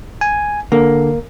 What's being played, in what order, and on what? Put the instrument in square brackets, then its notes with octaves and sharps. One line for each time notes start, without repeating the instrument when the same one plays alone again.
[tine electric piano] G#5
[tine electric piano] D3 [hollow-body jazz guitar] A#3